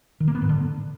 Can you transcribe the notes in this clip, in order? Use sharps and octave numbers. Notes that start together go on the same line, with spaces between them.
D#3
A#3
B3
G#2
D3